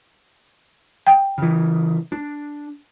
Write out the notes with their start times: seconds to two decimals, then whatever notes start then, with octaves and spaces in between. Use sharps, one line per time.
1.07 G5
1.38 C#3 E3
2.12 D4